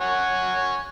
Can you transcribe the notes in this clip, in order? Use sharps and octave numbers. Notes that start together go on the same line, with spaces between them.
C#5 F#5 G#5